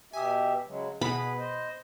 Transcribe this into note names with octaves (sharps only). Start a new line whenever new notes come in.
B2 G4 E5 G#5 D#6
C#3 F#3 G#3
B2 B3 G#4 B4 B5
C5 D#5